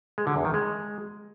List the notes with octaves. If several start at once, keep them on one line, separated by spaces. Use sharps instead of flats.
G#3
D3
E2
D#3
G#3